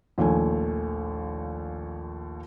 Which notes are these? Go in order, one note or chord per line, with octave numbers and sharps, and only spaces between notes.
A#1 D#2 A3 G#5